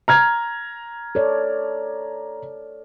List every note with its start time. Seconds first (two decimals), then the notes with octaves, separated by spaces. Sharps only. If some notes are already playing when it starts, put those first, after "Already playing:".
0.08 A#5 F6 G#6
1.15 A4 C#5 D5